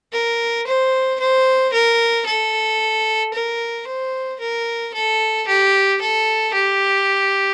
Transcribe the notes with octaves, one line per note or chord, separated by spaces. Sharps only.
A#4
C5
C5
A#4
A4
A#4
C5
A#4
A4
G4
A4
G4